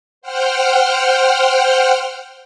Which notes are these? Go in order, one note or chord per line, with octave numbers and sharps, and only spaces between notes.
C5 F#5 G5 F6